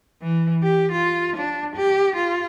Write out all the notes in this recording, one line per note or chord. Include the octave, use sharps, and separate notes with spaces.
E3
G4
F4
D4
G4
F4